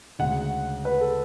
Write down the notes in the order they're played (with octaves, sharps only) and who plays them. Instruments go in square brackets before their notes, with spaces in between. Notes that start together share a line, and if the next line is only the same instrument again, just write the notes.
[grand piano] D2 C#3 G#3 F#5
B4
A4